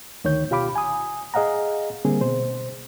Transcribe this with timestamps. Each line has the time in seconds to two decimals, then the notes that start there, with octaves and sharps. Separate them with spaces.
0.24 D2 D#3 C#5 G6
0.50 B2 F4 G4 F5 B5 D6
0.75 G#5 D#6
1.34 G#4 D#5 F5 F#5 A#5
2.05 D3 G3 A#3 C4 G#4
2.21 B2 C5